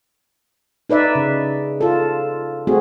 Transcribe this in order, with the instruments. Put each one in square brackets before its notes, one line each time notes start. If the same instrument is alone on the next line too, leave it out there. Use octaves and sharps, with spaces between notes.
[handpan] D#4 B4 D5 E5
C#3
F4 A4
A3 C4 F#4 G#4